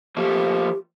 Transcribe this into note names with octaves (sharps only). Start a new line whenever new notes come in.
F3 A3 A#3 G4